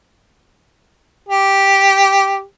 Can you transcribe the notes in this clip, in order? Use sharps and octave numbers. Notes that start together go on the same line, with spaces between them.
G4